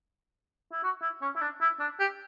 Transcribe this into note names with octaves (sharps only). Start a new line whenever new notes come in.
E4
F#4
E4
C#4
E4
D4
E4
D4
G4